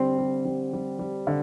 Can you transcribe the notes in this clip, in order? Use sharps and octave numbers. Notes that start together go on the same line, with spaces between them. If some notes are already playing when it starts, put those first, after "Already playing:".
Already playing: D3 G3 C4
G3
G3
G3
G3
D3